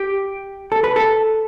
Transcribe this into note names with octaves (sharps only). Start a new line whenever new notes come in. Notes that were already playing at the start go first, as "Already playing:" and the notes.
Already playing: G4
A4
B4
A4